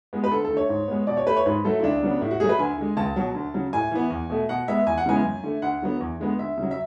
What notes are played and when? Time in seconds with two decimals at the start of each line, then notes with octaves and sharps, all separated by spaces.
0.13 G#3 B3
0.24 B4
0.31 D2 A4
0.45 A4
0.50 D3 A3
0.57 C#5
0.69 G#2
0.88 G#3 B3
1.07 B2 D5
1.17 C#5
1.27 A3 B4
1.36 C#5
1.46 G#2 B4
1.65 F#3 A3 A4
1.79 E4
1.83 C#2 D4
2.03 C#3 F#3 B3
2.21 A2 E4
2.31 F#4
2.40 F#3 A3 G#4
2.49 B4
2.59 D2 G#5
2.78 D3 G#3
2.97 C#2 A5
3.16 B2 F#3
3.34 D2
3.54 C#3 F#3
3.73 A2 G#5
3.91 E3 B3
4.10 E2
4.30 B2 A3
4.49 B2 F#5
4.68 G#3 B3 E5
4.86 E2 G#5
4.98 F#5
5.06 C#3 E3 G#3 B3 G#5
5.25 F#2
5.43 D3 A3
5.62 D2 F#5
5.82 D3 F#3 B3
6.00 E2
6.20 D3 G#3 B3
6.39 D2 E5
6.58 C#3 F#3
6.71 E5